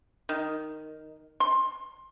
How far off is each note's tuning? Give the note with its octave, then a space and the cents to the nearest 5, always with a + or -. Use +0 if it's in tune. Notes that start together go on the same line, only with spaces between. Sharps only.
D#3 -5
C6 +20